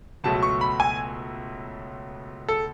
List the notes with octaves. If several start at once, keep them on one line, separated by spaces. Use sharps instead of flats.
C#2 B2 F#3 A3 A5
C#6
B5
G#5
A4